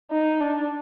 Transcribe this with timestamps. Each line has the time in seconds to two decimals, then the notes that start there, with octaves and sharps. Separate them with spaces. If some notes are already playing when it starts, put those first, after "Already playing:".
0.11 D#4
0.41 D4